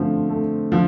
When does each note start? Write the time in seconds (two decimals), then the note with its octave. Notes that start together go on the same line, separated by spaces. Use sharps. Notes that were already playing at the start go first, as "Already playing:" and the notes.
Already playing: D3 F3 A3 C4
0.30 A3
0.72 D3 F3